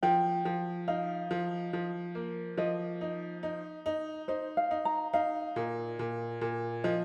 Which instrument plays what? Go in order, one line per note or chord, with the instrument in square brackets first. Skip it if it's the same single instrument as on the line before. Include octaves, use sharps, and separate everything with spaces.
[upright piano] F3 [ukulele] G5
[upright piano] F3
[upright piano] D#4 [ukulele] F5
[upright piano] F3
F3
A#3
[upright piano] F3 [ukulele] D#5
[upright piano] D#4
D#4
D#4
[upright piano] D#4 [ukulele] C5
[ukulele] F5
[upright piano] D#4
[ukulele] A#5
[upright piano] D#4 [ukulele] F5
[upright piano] A#2
A#2
A#2
[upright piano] F3 [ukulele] D#5